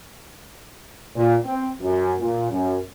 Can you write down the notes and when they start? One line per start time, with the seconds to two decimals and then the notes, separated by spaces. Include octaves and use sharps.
1.16 A#2
1.44 C4
1.81 F#2
2.19 A#2
2.50 F#2